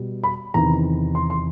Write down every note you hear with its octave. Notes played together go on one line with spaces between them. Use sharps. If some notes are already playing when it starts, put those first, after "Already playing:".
Already playing: B2 G3
B5
E2 C3 D#3 A#5
C6
C6